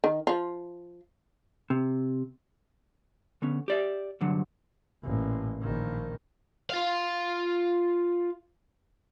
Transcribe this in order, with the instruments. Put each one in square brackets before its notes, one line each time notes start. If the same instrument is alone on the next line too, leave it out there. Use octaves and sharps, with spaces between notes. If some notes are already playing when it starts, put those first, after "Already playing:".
[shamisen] D#3
F3 F4
[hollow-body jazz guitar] C3
D3 B3 C#4
G4 D5 E5
C2 G2 D3 F#3
[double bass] A1 A#2
A#1 D#3
[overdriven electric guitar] F4 F5